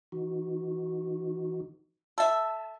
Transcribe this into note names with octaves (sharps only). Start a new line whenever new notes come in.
E3 D#4 F#4
A4 E5 A5